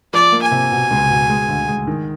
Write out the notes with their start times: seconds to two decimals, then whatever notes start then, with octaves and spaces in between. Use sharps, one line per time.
0.13 F3 D5
0.32 A#3
0.42 G#5
0.51 C3
0.72 B2
0.91 C#2
1.10 B2
1.29 G#3
1.48 D2
1.68 G#3
1.87 D#3